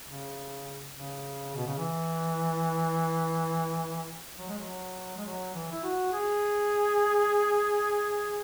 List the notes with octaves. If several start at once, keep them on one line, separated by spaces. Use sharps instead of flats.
C#3
C#3
B2
C#3
E3
F#3
G#3
F#3
G#3
F#3
E3
E4
F#4
G#4